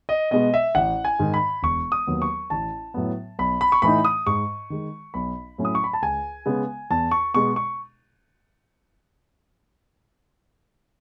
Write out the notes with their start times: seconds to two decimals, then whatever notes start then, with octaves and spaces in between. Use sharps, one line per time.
0.09 D#5
0.31 B2 G#3 B3 D#5
0.54 E5
0.75 A1 F#5
1.05 G#5
1.19 G#2 D#3
1.34 B5
1.63 E1 C#6
1.92 D#6
2.07 D#2 D#3 F#3 B3
2.22 C#6
2.50 A1 A5
2.94 A2 F#3 B3
3.39 B1 B5
3.61 B5
3.72 C#6
3.82 A2 E3 A3 D#4 B5
4.05 D#6
4.27 G#2 C#6
4.70 D#3 G#3
5.14 B1 B5
5.58 A2 F#3 A3 C#4
5.65 D#6
5.75 C#6
5.84 B5
5.93 A5
6.02 C#2 G#5
6.46 C#3 G#3 B3
6.91 E2 A5
7.11 C#6
7.34 B2 G#3 B3 C#6
7.56 C#6